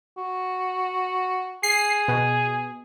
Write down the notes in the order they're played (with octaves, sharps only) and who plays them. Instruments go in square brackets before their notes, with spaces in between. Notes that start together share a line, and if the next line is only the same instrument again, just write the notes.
[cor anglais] F#4
[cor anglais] G#4 [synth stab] C7
[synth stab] B2